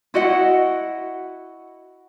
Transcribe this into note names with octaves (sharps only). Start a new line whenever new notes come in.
E4 F#4 D#5 F#5